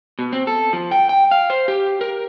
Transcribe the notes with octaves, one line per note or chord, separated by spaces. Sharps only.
B2
C4
A4
F3
G5
G5
F5
C5
G4
A#4